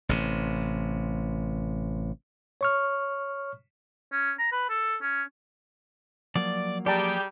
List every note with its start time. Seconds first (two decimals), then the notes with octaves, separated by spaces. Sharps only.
0.09 A1 C3
2.61 C#5 C#6 F6
4.12 C#4
4.39 A#5
4.52 B4
4.70 A4
5.02 C#4
6.36 F3 F#3 A#3 D5
6.86 G3 G4 G#4 D5 G5 A5 A#5